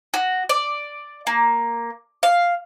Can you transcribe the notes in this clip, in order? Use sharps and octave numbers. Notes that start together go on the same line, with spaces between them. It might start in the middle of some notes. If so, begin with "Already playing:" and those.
F#4
D5
A#3
F5